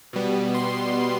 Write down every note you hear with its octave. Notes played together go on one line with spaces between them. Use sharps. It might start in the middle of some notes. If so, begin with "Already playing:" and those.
B2 G3 B3
C6